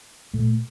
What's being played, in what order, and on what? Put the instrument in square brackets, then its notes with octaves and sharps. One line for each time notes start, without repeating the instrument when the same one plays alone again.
[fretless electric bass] A#2 A3